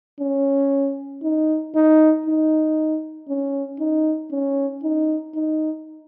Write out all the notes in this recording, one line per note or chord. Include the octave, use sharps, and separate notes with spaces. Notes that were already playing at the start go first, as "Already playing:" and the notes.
C#4
D#4
D#4
D#4
C#4
D#4
C#4
D#4
D#4